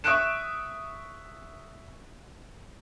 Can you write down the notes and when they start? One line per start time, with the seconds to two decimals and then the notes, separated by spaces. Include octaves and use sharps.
0.04 E5 C#6 D#6 F#6 D7 E7